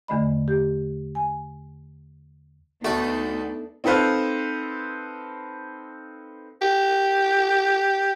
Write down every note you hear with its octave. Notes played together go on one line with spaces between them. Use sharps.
E2 D3 A3 D#5 B5
G4
G#5
D2 A3 B3 D4 D#4 F#4 A5
C4 D#4 A4 B4 C5 F5
G4